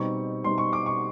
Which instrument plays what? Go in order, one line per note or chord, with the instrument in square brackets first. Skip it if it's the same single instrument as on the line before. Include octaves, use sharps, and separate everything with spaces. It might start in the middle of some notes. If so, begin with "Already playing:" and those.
Already playing: [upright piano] B2 G3 C4 D#4 C#6
B2 G3 C4 D#4 C6
C#6
D6
C#6